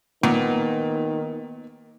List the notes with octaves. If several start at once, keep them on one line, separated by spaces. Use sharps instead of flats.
A#2 D#3 B3